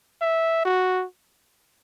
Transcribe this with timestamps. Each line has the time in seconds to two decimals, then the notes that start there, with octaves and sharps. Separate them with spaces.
0.22 E5
0.65 F#4